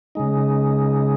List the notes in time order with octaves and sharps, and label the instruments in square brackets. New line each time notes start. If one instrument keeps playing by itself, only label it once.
[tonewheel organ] C#3 G#3 D#4